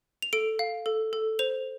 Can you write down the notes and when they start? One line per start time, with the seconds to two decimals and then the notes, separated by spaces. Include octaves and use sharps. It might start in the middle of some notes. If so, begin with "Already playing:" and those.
0.22 F7
0.33 A4 D7
0.59 F5
0.86 A4
1.13 A4
1.39 C5 F7